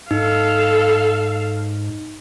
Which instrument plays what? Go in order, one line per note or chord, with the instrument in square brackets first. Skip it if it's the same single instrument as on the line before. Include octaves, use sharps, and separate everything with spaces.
[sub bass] G#2 [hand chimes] D#4 [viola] A4 F5